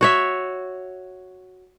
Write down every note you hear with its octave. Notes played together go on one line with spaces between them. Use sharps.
F#4 C#5 E5